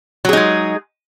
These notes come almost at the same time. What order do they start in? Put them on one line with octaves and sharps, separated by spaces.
F#3 G#4 D#4 G#3